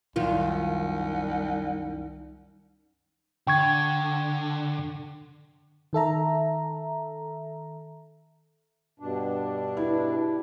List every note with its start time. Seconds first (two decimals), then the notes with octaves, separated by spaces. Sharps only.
0.16 C2 F#2 D#3 F4
3.47 D3 G5 C#6 G#6
5.93 D#3 A4 E5 A#5
9.00 G2 B2 D4
9.77 E4